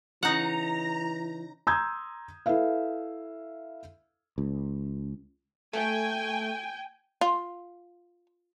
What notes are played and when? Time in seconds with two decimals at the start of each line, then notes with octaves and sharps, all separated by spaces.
0.23 C#3 E3 D#4 F#5 A#5
1.67 A#5 C6 D#6 E6 G6 G#6
2.46 E4 A4 B4 E5 F5
4.38 C#2
5.73 A3 G5 G#5
7.21 F4